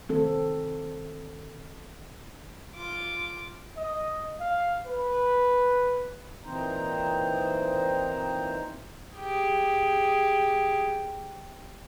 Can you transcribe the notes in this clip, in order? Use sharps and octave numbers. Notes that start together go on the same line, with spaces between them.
D#3 C4 A4
F4 D6
D#5
F5
B4
A#2 E3 C4 D#4 C5 A#5
G4 G#4